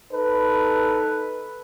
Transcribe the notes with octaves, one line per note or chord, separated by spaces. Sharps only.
D#4 A4 B4